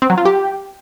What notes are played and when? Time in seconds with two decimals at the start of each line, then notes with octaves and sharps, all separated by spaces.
0.02 C4
0.10 F#3
0.18 F4
0.25 G4